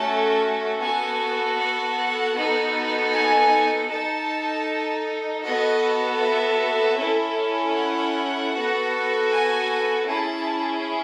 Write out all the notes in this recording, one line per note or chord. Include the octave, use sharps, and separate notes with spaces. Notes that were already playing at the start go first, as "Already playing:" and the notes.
Already playing: A3 C#4 F#4 A4 A5
B3 F#4 A4 G#5
F#5
B3 D#4 F#4 A4
G#5
D#4 A4 A5
B3 F#4 A4 D#5
E5
C#4 E4 A4
F#5
B3 F#4 A4
G#5
C#4 E4 G#4 A5